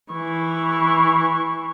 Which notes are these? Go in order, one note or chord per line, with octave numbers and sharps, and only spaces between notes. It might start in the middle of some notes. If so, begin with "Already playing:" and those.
E3 C#6